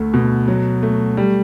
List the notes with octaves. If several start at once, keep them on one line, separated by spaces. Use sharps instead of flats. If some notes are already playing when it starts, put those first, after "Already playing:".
Already playing: D2 A3
B2
F#3
A3
G3